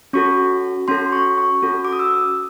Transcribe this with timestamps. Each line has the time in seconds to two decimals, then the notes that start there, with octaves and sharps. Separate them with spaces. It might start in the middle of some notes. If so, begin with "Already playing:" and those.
0.13 C#4 F#4 A4 C#6
0.88 C#4 F#4 A4 C6
1.12 C#6
1.38 C#6
1.62 C#4 F#4 A4
1.85 D6
1.93 D#6
1.99 E6